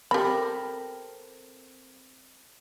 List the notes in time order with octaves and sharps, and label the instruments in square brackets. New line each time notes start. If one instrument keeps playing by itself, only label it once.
[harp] C4 A4 A#4 [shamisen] G4 B5